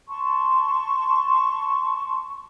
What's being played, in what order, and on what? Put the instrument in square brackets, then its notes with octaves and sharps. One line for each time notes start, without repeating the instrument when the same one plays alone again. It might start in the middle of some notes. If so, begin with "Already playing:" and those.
[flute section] A5 C6 C#6